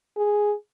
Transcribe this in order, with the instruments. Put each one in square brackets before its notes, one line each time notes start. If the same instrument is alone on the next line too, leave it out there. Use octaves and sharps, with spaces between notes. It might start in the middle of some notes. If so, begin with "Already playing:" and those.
[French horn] G#4